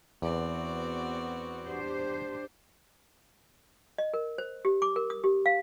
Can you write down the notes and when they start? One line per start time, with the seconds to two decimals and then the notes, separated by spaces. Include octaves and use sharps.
0.22 E2 B3 C4 F#4 D5
1.66 D4 G4 C5
3.98 D#5
4.14 A#4
4.38 C5
4.65 G4
4.82 D6
4.96 A#4
5.10 D#6
5.24 G4
5.46 F5